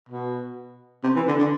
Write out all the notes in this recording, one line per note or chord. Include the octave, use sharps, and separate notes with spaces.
B2
C3
E3
D3
D3